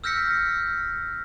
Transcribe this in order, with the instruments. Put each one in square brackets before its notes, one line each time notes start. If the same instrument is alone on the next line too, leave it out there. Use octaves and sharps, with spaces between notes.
[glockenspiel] E6 F6 G6 A#6 B6 C#7